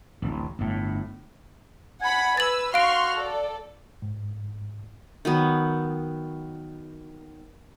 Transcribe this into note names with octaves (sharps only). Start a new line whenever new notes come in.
D1 A1
G1 A2
F#5 G#5 B5
B4 E6 A6 F#7
F#4 F5 C6 C#6 F6 D7
A4 D5
G#2
D#3 F#3 B3